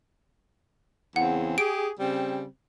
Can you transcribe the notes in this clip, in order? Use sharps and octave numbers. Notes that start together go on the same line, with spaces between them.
E2 C#3 C4 F#5
G4 G#4 D7
C#3 G3 C4